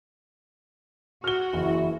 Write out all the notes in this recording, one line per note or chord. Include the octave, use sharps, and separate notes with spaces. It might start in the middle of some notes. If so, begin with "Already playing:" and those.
F#4 F6 G7
F#1 E3